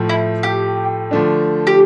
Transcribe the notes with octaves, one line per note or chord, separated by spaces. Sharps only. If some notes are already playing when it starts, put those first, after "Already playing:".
Already playing: A2 F3 A3
E4
G4
D3 F3 A3 D4
G4